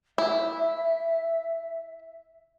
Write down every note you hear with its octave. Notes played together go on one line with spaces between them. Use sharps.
E4 E5